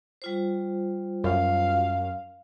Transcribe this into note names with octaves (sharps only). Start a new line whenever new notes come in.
G3 F4 C5
F#2 F5